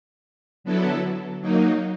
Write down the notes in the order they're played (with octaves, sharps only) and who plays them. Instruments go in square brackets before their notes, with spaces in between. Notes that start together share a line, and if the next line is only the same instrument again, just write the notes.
[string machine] D3 F#3 B3 E4 A4
F#3 A#3 D#4